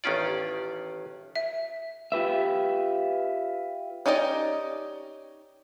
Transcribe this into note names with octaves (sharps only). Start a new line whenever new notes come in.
A1 D#3 C#4 F4 D5
E5
F4 G4 B4 E5
C#4 D#4 G4 D5 D#5